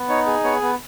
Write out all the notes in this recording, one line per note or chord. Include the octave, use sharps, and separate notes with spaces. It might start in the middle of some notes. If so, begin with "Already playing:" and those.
Already playing: B3
D#4 C#5
G#4
B3 C#5
B3